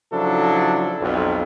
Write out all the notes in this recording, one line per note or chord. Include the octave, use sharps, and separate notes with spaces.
C#3 F3 F#3 D4 E4 A4
B1 F2